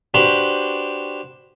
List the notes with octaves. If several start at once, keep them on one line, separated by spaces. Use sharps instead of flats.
D4 F#4 G4 B4 C5